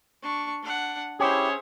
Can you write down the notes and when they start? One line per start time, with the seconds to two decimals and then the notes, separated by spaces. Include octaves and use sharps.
0.22 D4 C#6
0.62 D4 F#5
1.20 C#4 E4 G4 G#4 C5 C#5 E5